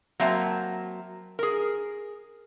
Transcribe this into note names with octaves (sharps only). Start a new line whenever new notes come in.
F#3 A#3 C4 E5 A5 A#5
G#4 A#4